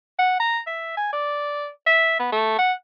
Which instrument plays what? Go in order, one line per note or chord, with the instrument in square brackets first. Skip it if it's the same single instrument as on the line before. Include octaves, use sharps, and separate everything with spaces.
[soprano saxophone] F#5
A#5
E5
G#5
D5
E5
B3
A3
F#5